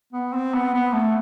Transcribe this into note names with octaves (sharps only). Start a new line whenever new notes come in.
B3
C4
B3
B3
A3